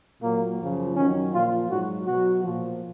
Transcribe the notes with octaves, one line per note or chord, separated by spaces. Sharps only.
A#2 F#3 A#3
F#2 C#3 F3
F#2 D#3 F#3 C#4
A#2 F3 F4
G#2 F#3 F#4
B2 F#3 F#4
A#2 F3